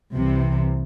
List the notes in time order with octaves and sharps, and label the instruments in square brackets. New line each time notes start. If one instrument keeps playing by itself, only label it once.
[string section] C2 C3 E3